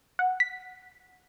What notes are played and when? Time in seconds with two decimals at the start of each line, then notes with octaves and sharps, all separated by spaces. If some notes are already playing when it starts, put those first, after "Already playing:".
0.19 F#5
0.40 B6